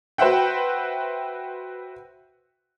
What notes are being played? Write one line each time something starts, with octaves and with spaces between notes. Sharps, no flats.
F#4 B4 C5 E5 F#5 G5